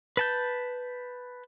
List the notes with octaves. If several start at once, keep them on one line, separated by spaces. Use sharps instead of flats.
B4 A5 G6